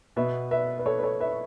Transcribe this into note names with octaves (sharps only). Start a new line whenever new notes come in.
B2 B3 B4 E5
B4 E5
B4
A4 C#5
B4
A4 C#5
B4 E5